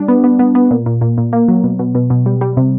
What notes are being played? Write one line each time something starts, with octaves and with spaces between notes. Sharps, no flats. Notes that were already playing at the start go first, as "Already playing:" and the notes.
Already playing: G3 D4
B3
B3
B3
B3
A#2
A#2
A#2
A#2
A#3
F#3
B2
B2
B2
B2
G3
G3
C3